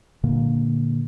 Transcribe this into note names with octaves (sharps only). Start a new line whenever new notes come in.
A#2 D3 A#3